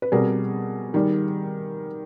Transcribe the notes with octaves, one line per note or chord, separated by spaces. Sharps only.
B4
B2 G3 C4 G#4 A#4
D#3 G3